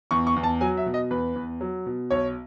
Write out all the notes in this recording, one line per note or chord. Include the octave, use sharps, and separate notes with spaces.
E2 C#6
C#6
E2
A5
F#3 G#5
E5
B2
D#5
E2 B4
E2
F#3
B2
B1 C#5